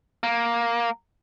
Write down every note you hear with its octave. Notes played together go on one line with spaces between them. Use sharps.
A#3